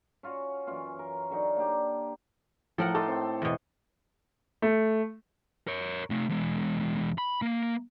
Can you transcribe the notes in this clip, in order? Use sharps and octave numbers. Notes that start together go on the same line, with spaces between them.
C#4 F4 F#4 F#5
F#2 E3 C#4 F4
A#4
D3 F#3 D#4
A#3 D4 G4
A2 F3 A4 A#4 F#5
D#4 A4 C6 D6
C4
E2 B2
A3
A#4 C#5
C3 A3
E2 G#3
B5
A#3